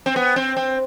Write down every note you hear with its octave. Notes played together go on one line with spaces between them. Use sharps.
C4
B3
C4
C4